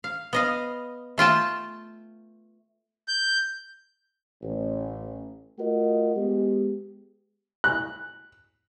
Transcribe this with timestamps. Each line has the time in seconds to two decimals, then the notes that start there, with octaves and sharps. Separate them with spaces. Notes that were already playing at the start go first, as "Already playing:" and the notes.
0.04 F5
0.33 B3 D#5 F5
1.18 A3 F4 G5 A5
3.08 G6
4.42 A1
5.59 A3 F4 F#4 A#4 D#5 F#5
6.15 G#3 B3 G4
7.64 F#6